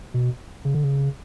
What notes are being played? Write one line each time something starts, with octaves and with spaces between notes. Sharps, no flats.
B2
C#3
D3
C#3